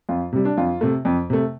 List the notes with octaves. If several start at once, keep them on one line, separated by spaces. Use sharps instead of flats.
F2 F4
C3 G3
D4
F2 F4
C3 A3
F2
C3 A3